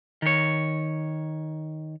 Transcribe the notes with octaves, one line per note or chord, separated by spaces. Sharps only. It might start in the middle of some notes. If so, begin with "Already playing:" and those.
D#3 C#5